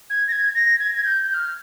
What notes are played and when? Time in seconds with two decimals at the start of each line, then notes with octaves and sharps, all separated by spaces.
0.10 G#6
0.28 A#6
0.32 G#6
0.54 A#6
0.79 G#6
0.94 G#6
1.04 G6
1.30 G6
1.34 F6